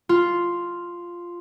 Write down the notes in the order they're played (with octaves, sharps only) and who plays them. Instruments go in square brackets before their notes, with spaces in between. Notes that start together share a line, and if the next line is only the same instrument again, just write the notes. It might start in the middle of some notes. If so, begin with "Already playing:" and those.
[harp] F4